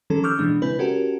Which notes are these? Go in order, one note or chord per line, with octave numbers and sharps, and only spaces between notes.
D#3 F3 G3 C#4 A4
C#6 D6 E6 F6 G6
B2 E3 G#3 D4
C#3 C4 E4 B4
C#4 F#4 G4 A4 A#4